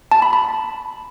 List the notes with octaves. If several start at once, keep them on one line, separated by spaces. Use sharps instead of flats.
A5
B5
B5